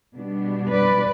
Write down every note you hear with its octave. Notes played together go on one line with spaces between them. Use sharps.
B2 G3 B3 D4
B4 D5